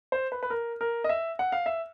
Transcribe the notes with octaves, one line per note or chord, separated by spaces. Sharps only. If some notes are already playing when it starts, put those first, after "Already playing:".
C5
B4
B4
A#4
A#4
D#5
E5
F#5
F5
E5